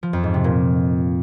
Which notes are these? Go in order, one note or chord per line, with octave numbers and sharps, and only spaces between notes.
F3
F2
G#2
C3
A#2